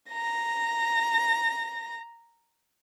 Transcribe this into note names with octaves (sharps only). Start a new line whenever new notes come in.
A#5 A#6